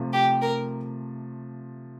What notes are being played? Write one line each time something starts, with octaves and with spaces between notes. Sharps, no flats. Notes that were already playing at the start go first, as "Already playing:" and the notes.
Already playing: C3 F3 A3
G4
A#4